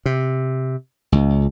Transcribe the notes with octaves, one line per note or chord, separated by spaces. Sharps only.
C3
C#2